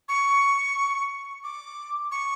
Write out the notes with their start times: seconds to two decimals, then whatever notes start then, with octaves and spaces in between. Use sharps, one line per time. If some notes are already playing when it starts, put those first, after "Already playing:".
0.09 C#6
1.44 D6
2.11 C#6